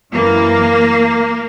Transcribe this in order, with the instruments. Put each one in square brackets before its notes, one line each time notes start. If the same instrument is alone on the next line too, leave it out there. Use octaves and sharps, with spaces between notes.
[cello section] F#2 E3 A#3